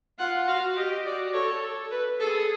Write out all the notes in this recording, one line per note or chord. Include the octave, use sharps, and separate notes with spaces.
F4 F#5
F#4 F5
G4 D#5
F#4 D5
A4 C#5
B4
G#4 A4